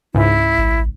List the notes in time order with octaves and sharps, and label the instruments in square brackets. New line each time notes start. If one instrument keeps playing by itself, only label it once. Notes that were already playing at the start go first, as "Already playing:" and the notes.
[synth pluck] C#2 G#2 [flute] E4
[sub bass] A1